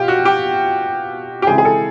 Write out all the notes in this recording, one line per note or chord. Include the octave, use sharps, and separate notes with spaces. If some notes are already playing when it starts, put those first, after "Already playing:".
Already playing: B2 F4 G4
F#4
G4
G4
C#3 E3 G#3 C4 E4 G#4
G#4
A4